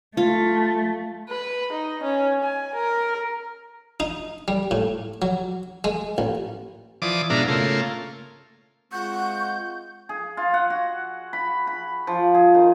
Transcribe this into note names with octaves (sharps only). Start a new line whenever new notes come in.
A3 F4
B4
D#4
C#4
G#5
A#4
D#4
G3
A2
F#3
G#3
A1
E3 F3 D5 D6 D#6
G#2 B2 D4 E4 F5 A#5
C#3 A3 A#3 F4
G#3 C4 F4 F#5 C#6 G6
G#4
F4
F#5
F#4
B5
B5
F3
G#4
D#3